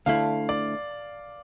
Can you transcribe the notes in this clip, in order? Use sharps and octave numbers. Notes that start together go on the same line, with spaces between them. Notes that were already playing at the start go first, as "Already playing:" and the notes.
D2 D3 A3 E4 F5
D5